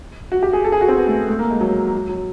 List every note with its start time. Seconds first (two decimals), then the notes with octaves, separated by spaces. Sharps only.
0.32 F#4
0.43 G4
0.53 G#4
0.64 A4
0.72 G#4
0.81 F#4
0.88 C4
0.97 B3
1.08 A3
1.28 A3
1.39 A#3
1.50 G#3
1.60 F#3
1.93 F#3
2.09 F#3